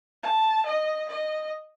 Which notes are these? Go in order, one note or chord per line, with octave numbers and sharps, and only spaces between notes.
A5
D#5
D#5